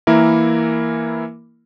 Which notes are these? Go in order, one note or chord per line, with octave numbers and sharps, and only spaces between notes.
E3 A#3 E4 A#4